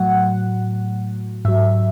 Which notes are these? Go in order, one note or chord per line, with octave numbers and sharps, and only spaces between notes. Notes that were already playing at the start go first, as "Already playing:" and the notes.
Already playing: A2 F#3 F#5
G#2 F#3 E5